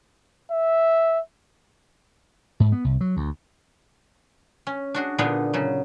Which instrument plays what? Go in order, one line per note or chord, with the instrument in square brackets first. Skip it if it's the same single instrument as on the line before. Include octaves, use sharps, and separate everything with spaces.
[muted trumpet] E5
[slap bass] G#2
B3
C2
F#3
D2
[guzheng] C#4
D4 F#4 G#4
A#2 D3 B3 D4 D#4 G#4
C#3 F#3